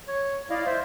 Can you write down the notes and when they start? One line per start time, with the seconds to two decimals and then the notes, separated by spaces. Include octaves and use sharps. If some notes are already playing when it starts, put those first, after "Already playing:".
0.08 C#5
0.50 E4 D5 D#5 F5
0.66 C5 E5